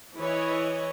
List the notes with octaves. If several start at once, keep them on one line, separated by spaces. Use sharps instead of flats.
E3 E4 G#4 B4 C#5 D#5